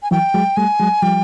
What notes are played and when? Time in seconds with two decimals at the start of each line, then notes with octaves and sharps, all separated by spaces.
0.03 G#5
0.11 E3 F#3 G5
0.34 F#3 G#3
0.57 G3 A3 G#5
0.80 F#3 G#3
1.02 F3 G3 G5